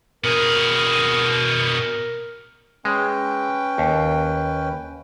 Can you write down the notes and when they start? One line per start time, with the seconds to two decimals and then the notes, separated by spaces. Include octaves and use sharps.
0.24 B2 G#4 A#4
2.85 G#3 C#4 B4 G5
3.78 D#2